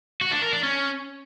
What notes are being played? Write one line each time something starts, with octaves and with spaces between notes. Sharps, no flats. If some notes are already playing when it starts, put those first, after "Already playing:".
F#4
D4
A#4
D4
C#4